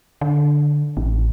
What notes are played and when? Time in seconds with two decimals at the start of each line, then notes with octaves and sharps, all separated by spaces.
0.21 D3
0.97 A1